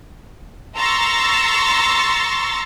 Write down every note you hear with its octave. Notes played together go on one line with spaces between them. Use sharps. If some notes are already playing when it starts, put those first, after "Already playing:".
A#5 C6 C#6 E6 A6